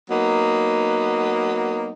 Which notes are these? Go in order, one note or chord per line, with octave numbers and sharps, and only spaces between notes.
F#3 A#3 B3 D#4